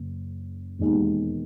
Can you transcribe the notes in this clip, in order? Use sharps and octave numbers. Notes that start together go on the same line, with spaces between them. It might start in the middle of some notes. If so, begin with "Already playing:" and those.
Already playing: F#1 C#3
E1 D#2 D#3 G#3